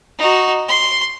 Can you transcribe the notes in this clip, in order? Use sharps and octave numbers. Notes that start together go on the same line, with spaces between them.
D#4 F#4
C6